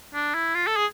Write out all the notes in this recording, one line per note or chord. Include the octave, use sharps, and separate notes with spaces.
D4
E4
F4
A4
G#4